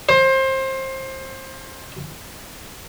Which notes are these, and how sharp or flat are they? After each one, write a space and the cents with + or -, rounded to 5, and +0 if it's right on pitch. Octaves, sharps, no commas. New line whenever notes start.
C5 +25